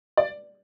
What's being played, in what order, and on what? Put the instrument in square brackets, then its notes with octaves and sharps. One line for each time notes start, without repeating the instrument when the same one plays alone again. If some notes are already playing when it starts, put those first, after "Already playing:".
[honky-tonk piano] D5